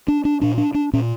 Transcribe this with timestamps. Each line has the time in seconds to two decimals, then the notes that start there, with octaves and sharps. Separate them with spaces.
0.08 D4
0.25 D4
0.41 A#2 D4
0.58 D4
0.74 D4
0.93 A#2 C#4